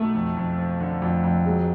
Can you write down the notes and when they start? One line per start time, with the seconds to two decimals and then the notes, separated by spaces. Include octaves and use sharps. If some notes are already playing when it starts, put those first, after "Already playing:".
Already playing: B1 A3
0.15 F2
0.37 F2
0.58 F3
0.80 D3
1.02 F2
1.24 F2
1.45 F#3 G#3